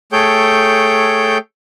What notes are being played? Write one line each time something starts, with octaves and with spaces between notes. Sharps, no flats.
A3 G#4 A4 C#5 G5 G6